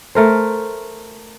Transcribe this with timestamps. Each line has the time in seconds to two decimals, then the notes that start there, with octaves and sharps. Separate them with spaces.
0.15 A3 A#4 C5